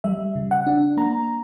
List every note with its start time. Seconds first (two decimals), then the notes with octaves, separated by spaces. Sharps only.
0.04 G3 E5
0.36 C#3
0.51 F#5
0.67 D4
0.97 A#3 A#5